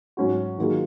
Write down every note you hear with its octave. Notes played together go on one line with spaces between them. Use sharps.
G#2 F#3 C#4 F#4
D#3 F#3 A#3 F4 G#4